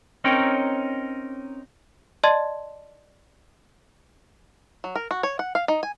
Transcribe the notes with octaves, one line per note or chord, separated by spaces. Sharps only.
C4 C#4 D#4 A#4 C#5 G5
D5 D#5 A5 C6 G#6
F#3
A#4
F#4
C#5
F#5
F5
D#4
G#5